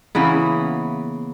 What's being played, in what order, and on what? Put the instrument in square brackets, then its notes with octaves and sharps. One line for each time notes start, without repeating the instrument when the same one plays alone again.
[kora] C#3 E3 A#3 B3